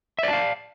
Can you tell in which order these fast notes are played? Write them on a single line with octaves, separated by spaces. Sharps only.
E5 D5 A5 F5